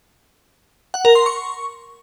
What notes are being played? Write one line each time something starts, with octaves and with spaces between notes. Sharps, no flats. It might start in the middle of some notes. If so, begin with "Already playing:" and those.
F#5
A#4
C6
C#6